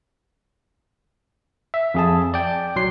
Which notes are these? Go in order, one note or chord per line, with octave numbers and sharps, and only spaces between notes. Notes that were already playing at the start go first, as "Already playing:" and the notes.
E5
F2 G#4 A5
D5 G5
B1 F#3 C6 C7